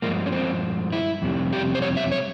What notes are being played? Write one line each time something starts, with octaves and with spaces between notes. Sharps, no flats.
G2 F3 G#3 A#3
C#4
C4
E4
F2 C3 G3
G4
C5
C#5
E5
C#5